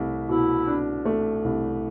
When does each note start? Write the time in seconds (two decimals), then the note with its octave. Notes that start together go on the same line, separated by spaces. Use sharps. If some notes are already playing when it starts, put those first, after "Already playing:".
Already playing: C2 A3
0.29 B2 E4
0.67 D4
1.05 A3
1.44 C2